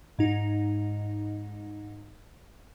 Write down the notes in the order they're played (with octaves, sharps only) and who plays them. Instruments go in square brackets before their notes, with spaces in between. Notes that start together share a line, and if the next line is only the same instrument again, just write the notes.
[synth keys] G#2 D#4